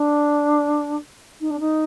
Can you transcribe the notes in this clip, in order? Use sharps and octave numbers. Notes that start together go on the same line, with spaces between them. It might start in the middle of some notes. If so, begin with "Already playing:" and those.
Already playing: D4
D#4
D4
D#4